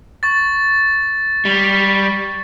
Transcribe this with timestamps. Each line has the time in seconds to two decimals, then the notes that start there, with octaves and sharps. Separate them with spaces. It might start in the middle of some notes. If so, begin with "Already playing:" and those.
0.23 C#6 A6
1.45 G3